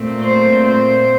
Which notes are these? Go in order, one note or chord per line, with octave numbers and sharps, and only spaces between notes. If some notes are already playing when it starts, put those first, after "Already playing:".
Already playing: A#2 A3 C4
C5
C5